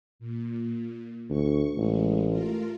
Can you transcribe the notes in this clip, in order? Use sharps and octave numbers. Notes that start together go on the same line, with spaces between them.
A#2
D2 C#6
A1 G#3
A3 F4 A#4